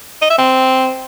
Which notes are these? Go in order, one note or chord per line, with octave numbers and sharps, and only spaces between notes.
D#5
E5
C4